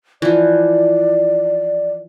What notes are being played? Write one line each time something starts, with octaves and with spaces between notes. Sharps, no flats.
E3 F3 D5